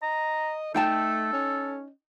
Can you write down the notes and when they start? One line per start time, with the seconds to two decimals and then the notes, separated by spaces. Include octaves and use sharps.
0.02 D#5 A#5
0.74 A3 D#4 A4 G5 A5
1.33 C#4